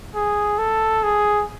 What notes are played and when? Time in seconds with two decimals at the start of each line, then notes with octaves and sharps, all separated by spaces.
0.15 G#4
0.58 A4
1.03 G#4